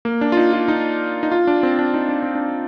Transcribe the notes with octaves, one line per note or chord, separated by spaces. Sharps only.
A#3
D4
F4
D#4
F4
D#4
D#4
F4
D4
C4
D4
D#4
D4
C4
D4